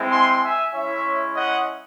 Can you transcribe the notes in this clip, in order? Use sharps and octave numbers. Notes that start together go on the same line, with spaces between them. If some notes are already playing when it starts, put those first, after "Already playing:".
Already playing: G#3 C4 E4
G#5 C6
E5 G#5
G#3 C#4 E4 C#5 E5
D#5 F#5